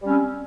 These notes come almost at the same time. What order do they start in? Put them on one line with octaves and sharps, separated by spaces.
G3 C#4 C4